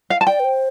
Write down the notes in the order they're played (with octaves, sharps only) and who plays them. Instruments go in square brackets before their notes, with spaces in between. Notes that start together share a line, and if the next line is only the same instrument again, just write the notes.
[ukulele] F5
A5
[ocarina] D5 [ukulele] G5
[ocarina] B4
C5